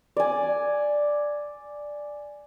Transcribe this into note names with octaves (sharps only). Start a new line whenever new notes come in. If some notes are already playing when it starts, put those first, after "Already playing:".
D5 G#5